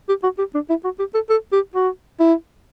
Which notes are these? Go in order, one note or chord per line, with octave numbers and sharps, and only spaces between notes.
G4
F#4
G4
D4
E4
F#4
G4
A4
A4
G4
F#4
E4